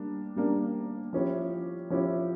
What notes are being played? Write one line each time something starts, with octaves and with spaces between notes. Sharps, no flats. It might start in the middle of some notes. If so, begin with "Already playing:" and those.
Already playing: G3 A#3 D4
G3 A#3 D4
F3 C#4 E4 G4
F3 C#4 E4 G4